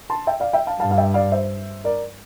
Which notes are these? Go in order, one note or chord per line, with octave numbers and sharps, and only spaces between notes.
A5 C6
E5 G5
D5 F5
E5 G5
F5 A5
G2 F5 A5
F5
E5 G5
D5 F5
C5 E5
A#4 D5